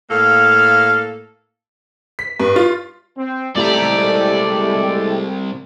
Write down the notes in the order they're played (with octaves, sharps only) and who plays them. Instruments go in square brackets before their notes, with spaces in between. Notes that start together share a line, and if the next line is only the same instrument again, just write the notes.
[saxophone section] A2 A#3 A4 [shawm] F5
[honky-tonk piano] B6
G2
F4
[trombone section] C4
[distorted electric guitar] C2 A#5 [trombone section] G#3 A4 [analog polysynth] A3 E4 G4 [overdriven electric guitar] D5